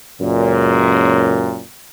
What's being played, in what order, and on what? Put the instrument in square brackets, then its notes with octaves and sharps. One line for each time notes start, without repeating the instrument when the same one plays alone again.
[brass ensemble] C#2 F#2 A#2